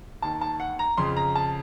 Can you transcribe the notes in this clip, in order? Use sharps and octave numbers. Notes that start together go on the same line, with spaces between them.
D#2 D#3 A5
A5
F#5
A#5
F2 C#3 C6
A#5
A5